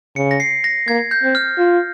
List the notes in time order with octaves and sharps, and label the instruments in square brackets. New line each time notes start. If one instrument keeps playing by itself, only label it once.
[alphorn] C#3 [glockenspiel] C#7
[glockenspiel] A#6
C7
A#6
[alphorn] A#3 [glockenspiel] G#6
[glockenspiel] G6
[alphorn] C4
[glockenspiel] F6
[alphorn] F4